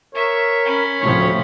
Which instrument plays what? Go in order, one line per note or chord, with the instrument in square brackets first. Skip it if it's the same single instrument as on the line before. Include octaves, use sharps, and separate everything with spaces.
[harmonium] A#4 [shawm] C#5 [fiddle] E5
[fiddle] C#4 B5
[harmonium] D2 [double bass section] A2 C3 F3 [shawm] C#5